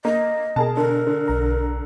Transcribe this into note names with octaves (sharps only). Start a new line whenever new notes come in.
A#3 D#5
B2 G#4 A#4 A5
D3 A#4
D3
B1 A#5